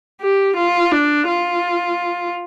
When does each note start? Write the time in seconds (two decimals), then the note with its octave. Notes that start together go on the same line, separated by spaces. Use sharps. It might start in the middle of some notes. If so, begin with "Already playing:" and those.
0.21 G4
0.56 F4
0.91 D4
1.28 F4